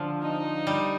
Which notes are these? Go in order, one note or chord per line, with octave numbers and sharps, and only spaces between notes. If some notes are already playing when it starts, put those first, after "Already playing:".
Already playing: D3 F3
D#4
G3